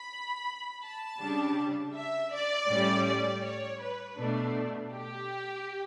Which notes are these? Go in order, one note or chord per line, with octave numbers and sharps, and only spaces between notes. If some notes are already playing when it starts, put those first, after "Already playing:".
Already playing: B5
A5
C#3 G3 D4
E5
D5
A2 G3 C#4
D5
C#5
B4
B2 A3 D4
G4